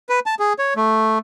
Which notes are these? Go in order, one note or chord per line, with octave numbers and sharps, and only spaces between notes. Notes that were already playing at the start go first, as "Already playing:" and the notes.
B4
A5
G#4
C#5
A3